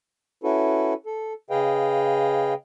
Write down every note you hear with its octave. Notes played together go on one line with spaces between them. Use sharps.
C#4 E4 F#4 A4 B4
A4
C#3 G#4 B4 D#5 F5 G5